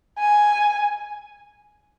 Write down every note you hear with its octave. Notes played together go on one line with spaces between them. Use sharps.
G#5